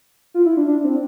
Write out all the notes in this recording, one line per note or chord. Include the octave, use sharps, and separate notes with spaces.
F4
E4
D4
D4
C4